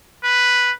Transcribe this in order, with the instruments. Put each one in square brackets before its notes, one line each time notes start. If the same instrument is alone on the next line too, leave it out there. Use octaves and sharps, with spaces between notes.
[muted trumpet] B4